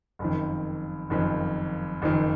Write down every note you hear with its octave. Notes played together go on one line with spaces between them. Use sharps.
F#1 F2 D#3
F#1 F2 D#3
F#1 F2 D#3